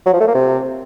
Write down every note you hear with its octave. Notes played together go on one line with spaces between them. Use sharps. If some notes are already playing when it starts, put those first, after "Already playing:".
F#3
F3
A3
A#3
C3